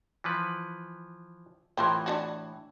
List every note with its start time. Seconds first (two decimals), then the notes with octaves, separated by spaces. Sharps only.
0.24 E3 F3 B4
1.77 A2 E3 C4 F4 A#4
2.06 D4 F4 F#4